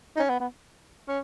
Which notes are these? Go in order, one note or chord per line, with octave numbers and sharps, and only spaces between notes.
D#4
C#4
B3
B3
C#4